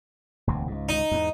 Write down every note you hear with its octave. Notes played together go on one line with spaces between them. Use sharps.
E1 D2 C3
C#2 G#2
D#4
E2 G#2